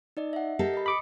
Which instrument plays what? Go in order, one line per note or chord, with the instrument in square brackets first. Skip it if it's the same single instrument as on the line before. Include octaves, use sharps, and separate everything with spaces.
[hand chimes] D#4 D5 D#5
E5 F#5
[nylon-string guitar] G4 A4 A#4 [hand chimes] D#5 C7
[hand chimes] D#5 B5
[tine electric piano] B5 D6 [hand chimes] D#6 C#7